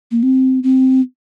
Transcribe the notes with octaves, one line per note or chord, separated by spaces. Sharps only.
A#3
C4
C4